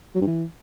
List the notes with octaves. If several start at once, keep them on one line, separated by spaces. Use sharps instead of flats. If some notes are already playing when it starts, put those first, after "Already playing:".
F#3
G2
E3